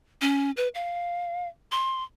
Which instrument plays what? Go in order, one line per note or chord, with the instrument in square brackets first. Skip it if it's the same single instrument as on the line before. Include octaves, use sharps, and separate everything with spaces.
[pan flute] C#4
B4
F5
C6